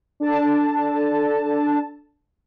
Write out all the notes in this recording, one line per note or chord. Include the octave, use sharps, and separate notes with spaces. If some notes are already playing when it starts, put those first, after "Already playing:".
D4 A4 A5